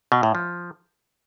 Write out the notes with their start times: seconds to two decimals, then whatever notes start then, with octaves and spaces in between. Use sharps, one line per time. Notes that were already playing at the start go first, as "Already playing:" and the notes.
0.12 B2
0.23 A2
0.35 F3